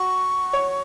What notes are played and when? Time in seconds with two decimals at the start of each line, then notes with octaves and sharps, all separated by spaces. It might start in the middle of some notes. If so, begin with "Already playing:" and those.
Already playing: F#4 C#6
0.53 C#5